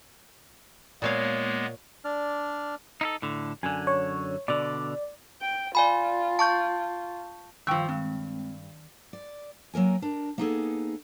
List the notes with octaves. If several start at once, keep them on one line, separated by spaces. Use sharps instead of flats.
A#2 G#3 A#3 B3 C#5 F5
D4 D5 F6
D#4 E4 A4
A2 D3
F#2 D3 G#5
C#5
B2 D3 D5
G5
F4 D5 G#5 B5
A5 C#6 G6
G2 D#3 F3 G5 C#6 E6
G2 G#3 C4
D5
F#3 A#3 A#4 G#5
D4 A#4
A#3 B3 D#4 F4 G#4 A4